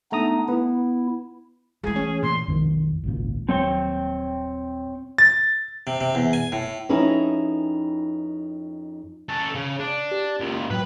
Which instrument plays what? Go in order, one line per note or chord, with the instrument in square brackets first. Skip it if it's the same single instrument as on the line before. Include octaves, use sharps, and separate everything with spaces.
[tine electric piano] A3 A#5 D#6 [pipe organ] B3 D4 D#4
[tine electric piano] B3 [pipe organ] E4
[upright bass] E3 A3 [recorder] G#4
[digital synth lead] C#4
[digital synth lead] A#2 [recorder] C6
[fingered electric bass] B1 F2 D#3
G#1 C#2 A#2
[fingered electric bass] D#1 F#3 [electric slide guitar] C4 C#5 G5
[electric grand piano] A6
[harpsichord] C3
C3
E2
G#5
A2
[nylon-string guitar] F2 C#4 D#4 E4 G#4 B4
[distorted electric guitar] C#4 A4
C#3
D4
[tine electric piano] G4
[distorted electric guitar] C#2 A#2
[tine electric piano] A2 F#3 G5 [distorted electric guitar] B4